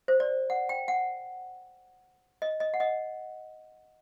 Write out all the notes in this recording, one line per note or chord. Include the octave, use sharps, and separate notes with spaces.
C5
D5
F#5
G5
F#5
D#5
D#5
F#5
D#5